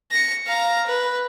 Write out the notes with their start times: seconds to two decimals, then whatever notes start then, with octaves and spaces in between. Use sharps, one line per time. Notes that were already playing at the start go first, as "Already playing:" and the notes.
0.11 A#6 C#7
0.46 F5 A#5
0.86 B4